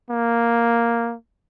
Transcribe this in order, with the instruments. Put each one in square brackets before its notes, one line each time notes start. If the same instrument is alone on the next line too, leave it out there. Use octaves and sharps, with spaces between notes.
[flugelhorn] A#3